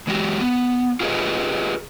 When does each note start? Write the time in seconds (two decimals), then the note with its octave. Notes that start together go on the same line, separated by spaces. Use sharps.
0.07 E3 G#3 F#4 G4
0.40 B3
1.00 F4 G4 G#4 A#4 B4 D#5